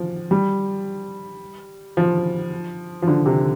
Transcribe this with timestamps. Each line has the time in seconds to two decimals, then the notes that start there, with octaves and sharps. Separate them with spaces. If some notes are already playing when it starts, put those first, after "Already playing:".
Already playing: F3
0.31 G3
1.97 F3
3.02 F3
3.08 D3
3.26 C3